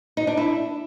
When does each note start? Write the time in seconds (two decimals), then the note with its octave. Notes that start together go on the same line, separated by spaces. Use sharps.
0.17 D#4
0.27 D4
0.37 E4